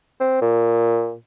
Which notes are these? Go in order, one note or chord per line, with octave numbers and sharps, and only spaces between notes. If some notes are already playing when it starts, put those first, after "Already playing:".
C4
A#2